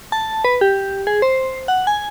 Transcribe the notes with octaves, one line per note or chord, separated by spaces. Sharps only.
A5
B4
G4
G#4
C5
F#5
G#5